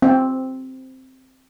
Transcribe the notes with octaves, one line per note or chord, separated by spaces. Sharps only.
C4